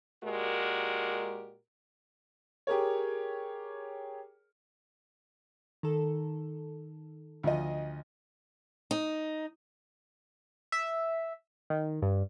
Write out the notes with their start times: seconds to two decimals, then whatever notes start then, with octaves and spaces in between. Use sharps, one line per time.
0.23 A#2 G#3 F#4 G4 A#4
2.67 G4 G#4 A#4 C#5
5.83 D#3 A4
7.43 D2 F3 D#5
8.91 D#4
10.72 E5
11.70 D#3
12.02 G2